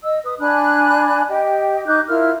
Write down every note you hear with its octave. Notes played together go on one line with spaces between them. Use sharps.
D#5 E6
B4 D#6
D4 G#5 B5 F#6
G4 D#5 G5
D#4 D6 F#6 G6
E4 F4 A#4 F6